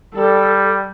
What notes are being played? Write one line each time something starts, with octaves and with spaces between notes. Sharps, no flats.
G3 A4